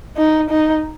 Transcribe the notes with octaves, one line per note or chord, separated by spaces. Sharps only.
D#4
D#4